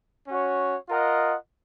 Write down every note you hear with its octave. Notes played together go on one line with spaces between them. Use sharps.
C#4 F#4 C#5
F4 A#4 D#5 F#5